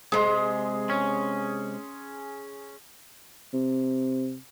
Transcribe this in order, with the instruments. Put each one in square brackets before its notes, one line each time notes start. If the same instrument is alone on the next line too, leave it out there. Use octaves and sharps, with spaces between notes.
[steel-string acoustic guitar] C3 G#3 [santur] G#4 C6
[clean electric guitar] C#4
[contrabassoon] C3